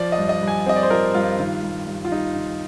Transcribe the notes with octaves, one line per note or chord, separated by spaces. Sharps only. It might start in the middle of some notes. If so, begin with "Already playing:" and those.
Already playing: F3 D5
D#5
G2
D#5
G2
G#5
C4 D#5
D5
C5
F3 A#4
G2 F4
D#3
G2
G2
F4
G3 D#4
D#3